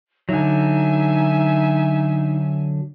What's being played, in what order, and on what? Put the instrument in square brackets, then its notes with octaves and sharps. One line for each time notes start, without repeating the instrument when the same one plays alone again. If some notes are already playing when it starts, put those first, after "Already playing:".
[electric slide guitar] D3 F#3 [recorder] D#4 [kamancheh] E5 G#5